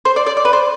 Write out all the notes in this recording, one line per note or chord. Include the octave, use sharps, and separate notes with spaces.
C5
D5
D5
D5
B4
C5